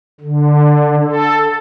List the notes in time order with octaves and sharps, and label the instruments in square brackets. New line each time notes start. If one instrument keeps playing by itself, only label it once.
[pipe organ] D3
A4